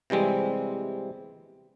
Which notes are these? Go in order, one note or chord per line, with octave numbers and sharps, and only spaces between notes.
C3 E3 G3 G#3 C4